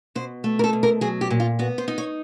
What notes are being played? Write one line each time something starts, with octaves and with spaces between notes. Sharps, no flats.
B2 C5
A3
A#4
A4
B2
A#4
F#3 G#4
G4
A#2
F4
B3 F#4
C5
D#4
C#5